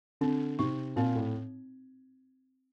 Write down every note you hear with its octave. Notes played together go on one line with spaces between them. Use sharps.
D3 C4
C3 D#4
A#2 C4
A2